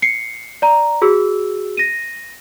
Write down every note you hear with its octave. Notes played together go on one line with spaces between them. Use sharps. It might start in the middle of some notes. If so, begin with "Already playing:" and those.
C7 C#7
D5 A#5
F#4 G#4 E6
A#6 D#7